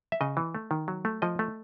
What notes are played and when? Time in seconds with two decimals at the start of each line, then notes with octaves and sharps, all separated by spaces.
0.12 E5
0.21 C#3 D#5
0.37 E3
0.55 A3
0.71 D#3
0.88 F#3
1.05 A3
1.22 F3 D#5
1.39 A3